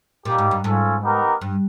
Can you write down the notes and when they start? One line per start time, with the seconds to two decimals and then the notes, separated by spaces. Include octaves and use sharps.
0.25 A#2 G3 A#3 D#4 G4
0.38 G#2
0.51 G2
0.64 G#2 C#4 F4 A4
1.03 B3 D#4 G4 A#4
1.41 G2